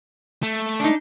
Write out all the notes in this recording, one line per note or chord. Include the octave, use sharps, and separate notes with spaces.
A3
D4 D#4